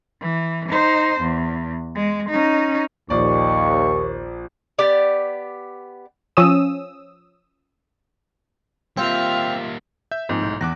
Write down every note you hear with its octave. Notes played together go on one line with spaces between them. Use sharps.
E3
D#4 C5
E2
G#3
C#4 D#4
A#1 D#2 D5 C#6
B3 G4 D5
F3 C#4 D#6 E6
G3 A#3 C4 F4 E5 F5
E5 G6
G#2 F3 A#3 C4
B1 A2
E2 D6 F#6 A#6